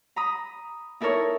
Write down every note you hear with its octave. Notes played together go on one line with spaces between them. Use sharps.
A#5 B5 D#6
D#4 E4 A4 A#4 C#5